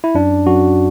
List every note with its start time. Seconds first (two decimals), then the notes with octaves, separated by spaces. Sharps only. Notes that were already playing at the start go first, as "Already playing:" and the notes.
0.04 E4
0.15 F#2 D4
0.46 F#2 F#4